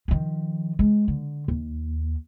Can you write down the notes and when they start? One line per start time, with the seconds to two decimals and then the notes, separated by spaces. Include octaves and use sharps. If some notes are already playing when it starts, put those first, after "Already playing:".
0.08 D#3 F3
0.79 G#3
1.08 D3
1.48 D#2